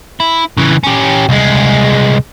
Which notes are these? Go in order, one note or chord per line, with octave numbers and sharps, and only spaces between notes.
E4
C#3 E3
C#4 G4
C2 G#3